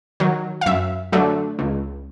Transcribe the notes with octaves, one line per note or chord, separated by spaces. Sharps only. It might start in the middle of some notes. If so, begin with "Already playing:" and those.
D#3 F#3
F5
F#2 E5
D3 F#3 A3 D4
C#2